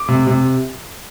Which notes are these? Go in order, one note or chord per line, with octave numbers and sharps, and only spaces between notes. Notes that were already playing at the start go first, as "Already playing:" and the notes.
Already playing: D6
C3
C3